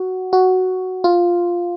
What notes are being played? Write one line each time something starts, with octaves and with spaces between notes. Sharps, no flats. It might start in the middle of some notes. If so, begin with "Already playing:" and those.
Already playing: F#4
F#4
F4